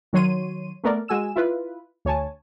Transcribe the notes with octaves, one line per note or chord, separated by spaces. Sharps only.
D#3 F#3 C#5 C6 D#7
A3 B3 A#4 D5
G#3 F#4 G#5 E6 E7
E4 F4 B4
D2 C#5 G#5 A5